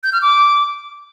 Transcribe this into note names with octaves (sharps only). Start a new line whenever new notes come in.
G6
F6
D6